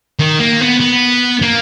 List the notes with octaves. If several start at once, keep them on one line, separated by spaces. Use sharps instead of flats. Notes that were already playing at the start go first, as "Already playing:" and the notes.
D#3
A#3
B3
B3
A#3